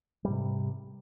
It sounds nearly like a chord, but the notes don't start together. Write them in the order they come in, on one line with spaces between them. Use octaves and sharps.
G3 G#2 C3